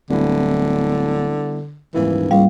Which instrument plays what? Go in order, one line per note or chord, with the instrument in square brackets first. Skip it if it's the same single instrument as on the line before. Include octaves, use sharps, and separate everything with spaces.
[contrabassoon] D1 [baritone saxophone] D3 [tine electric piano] G3 B3 E4
[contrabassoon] D#1 [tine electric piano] G#2 A#3 E4 [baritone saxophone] E3
[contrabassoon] C#2 [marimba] G3 F5